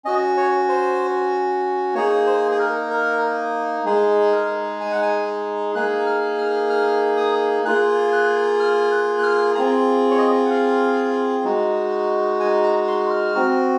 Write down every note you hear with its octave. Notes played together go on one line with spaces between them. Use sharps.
C#4 F#4 D#5
C#5
C5
A#3 D#4 G#4 C#5
C5
G#4
A#4
A#4
G#3 D#4 G#4
A#4
G#5
F#5
G#5
A#3 D#4 G#4 F#6
F6
F6
F6
D#6
A#3 F4 G#4 F#6
F#6
F6
F#6
F#6
F6
C4 F4 G#4 A#5
C#5
D#5
F#5
F5
G#3 D#4 F#4
G#5
A#5
C6
F6
C4 F#4